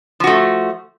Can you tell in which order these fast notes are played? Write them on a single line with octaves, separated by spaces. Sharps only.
F3 F#4 A3